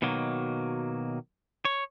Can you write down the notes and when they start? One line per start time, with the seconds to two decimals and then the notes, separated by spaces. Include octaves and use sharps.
0.02 B2 D#3 F#3 A#3
1.65 C#5